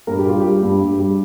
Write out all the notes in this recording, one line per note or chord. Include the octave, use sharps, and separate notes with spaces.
G2 A#4
G4
G3 F4
G3 G4
G2
G2
G3